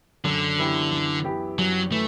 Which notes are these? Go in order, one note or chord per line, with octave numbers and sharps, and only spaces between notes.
F#2 D3
E3 B3 E4 G4
F#2
E3 B3 E4 G4
F#2 F#3
E3 A3